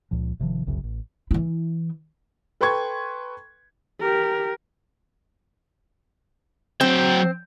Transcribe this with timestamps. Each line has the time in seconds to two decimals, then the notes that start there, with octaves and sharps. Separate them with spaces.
0.11 C#2 A#2 F3
0.39 G1 C3 D#3 F3
0.66 F#1 C2 F#2 C#3
0.84 A1
1.31 E3 E4
2.61 A4 B4 G5 C6 C#6 G#6
4.00 G4 A#4
6.81 F#3 C4 G5